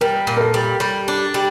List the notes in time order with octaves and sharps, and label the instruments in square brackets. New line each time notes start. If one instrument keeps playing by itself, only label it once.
[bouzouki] G3 [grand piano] A#4
[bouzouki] A#2
[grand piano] A#4
A4
[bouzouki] G3
G3
D4
G3